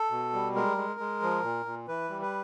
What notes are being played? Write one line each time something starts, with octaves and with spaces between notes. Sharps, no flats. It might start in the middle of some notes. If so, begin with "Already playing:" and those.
Already playing: A4
B2
G3
G#3 A#4
G#3
G#3
F3
A#2
A#2
E3 B4
G3
B4